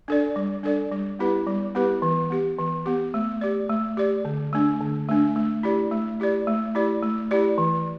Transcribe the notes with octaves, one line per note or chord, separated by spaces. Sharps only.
D4 A4 D5
G3
D4 A4 D5
G3
B3 E4 G4 B4
G3
B3 E4 G4 B4
E3
B3 G4
E3
B3 G4
A3
G4 D5
A3
G4 D5
D3
A3 D4
D3
A3 D4
A3
E4 G4 D5
A3
E4 G4 D5
A3
E4 G4 D5
A3
E4 G4 D5
E3